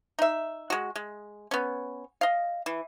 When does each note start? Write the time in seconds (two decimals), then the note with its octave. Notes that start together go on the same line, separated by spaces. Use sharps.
0.19 D#4 E5
0.70 G#3 F#4
0.96 G#3
1.51 B3 C#4
2.21 D#5 F5
2.66 E3